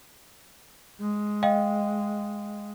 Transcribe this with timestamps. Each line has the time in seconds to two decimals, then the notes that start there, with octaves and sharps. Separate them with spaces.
1.00 G#3
1.43 D#5 F5 G5